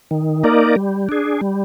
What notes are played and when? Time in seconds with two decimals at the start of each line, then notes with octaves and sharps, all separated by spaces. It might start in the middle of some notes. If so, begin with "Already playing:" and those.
0.11 D#3
0.44 A#3 D#4 A#4 D5
0.76 G3
1.09 D4 G#4
1.41 G3